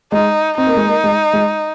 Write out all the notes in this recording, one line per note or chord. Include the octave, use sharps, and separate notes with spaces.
G#3 D#4
C4 D#4
A#3
G#3
A#3
G#3
G#3